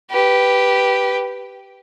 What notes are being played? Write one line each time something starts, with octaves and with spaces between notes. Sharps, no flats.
G4 B4